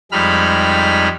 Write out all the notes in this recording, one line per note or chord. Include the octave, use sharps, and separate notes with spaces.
F2 G3 G#3 D#4 B5 F6